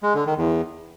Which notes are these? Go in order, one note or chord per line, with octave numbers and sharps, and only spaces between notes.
G#3
D3
D#3
E2